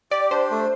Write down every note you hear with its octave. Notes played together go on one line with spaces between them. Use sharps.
G4 D5
D4 C5
A3